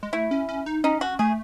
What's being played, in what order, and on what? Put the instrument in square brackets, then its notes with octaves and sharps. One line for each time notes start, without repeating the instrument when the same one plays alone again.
[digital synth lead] G#3
[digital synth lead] A3 [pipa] E4
[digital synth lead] C#4
C#4
D#4
[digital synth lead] C#4 [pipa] D#4
[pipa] F#4
[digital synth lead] A3 [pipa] G#4